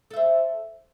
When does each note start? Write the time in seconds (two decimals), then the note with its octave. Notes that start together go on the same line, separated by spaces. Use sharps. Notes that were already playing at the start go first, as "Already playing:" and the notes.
0.10 A4
0.13 E5
0.16 C5